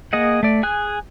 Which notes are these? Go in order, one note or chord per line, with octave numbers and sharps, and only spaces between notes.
A#3 G#4 D#5 F#5
A3 D5
G#4 G#5 F#6